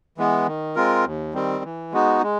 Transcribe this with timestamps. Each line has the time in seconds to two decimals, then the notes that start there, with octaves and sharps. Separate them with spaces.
0.18 E3 G#3 B3
0.47 D#3
0.75 G#3 C4 F4 A#4
1.05 D#2
1.34 D#3 G3 C4
1.64 E3
1.92 G#3 B3 D#4 F#4
2.22 G#3